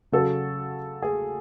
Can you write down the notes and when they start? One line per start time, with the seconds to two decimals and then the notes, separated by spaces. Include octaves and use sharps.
0.12 C#3 F#3 F#4 A4
1.02 G#4